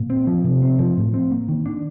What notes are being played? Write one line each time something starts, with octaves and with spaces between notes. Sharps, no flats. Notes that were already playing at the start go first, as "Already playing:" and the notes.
Already playing: A#2
C4
F3
C3
C4
F3
A2
C4
A#3
D#3
D4